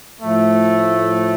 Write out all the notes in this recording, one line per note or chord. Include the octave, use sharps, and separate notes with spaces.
A2 F3 A3